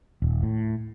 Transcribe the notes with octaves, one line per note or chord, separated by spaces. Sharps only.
D#1
A2